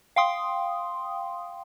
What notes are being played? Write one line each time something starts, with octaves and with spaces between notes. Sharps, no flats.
F5 G5 C6 D#6